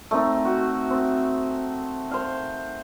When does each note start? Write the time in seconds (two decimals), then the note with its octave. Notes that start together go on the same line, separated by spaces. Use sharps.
0.11 A3 C4 D#4
0.45 F#4
0.90 C4
2.11 C5 F5